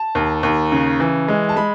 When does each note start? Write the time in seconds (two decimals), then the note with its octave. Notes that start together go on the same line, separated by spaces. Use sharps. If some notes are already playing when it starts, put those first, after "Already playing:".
Already playing: A5
0.15 D#2
0.43 D#2
0.72 C#3
1.00 E3
1.28 G#3
1.49 A5
1.56 G#3 B5